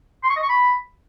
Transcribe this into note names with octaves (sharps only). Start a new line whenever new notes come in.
C6
C#6
D#5
C#6
B5